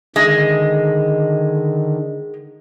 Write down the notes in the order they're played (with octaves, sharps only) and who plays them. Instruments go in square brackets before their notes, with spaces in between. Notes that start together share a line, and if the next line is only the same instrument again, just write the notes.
[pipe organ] D3 D#3 [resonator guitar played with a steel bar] G#3